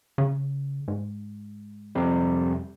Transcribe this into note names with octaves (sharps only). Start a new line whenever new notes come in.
C#3
G#2
F2 C3 G3